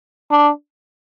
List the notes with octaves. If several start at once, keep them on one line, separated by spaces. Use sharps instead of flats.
D4